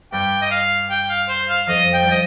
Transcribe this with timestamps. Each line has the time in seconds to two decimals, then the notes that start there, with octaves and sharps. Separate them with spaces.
0.13 G2 G3 G5
0.41 D#5
0.51 F5
0.90 G5
1.10 F5
1.29 C5
1.49 F5
1.67 F2 F3 D#5
1.93 G5
2.03 G3
2.07 F3 D#5